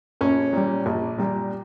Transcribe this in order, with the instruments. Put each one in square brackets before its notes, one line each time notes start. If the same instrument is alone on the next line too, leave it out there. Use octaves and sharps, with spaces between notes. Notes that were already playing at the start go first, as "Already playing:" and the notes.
[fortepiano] A#1 C#4
A#2 G3
A#1
A#2 G3